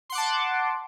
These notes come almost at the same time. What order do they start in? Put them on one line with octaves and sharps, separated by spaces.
C6 F#5 D6 A5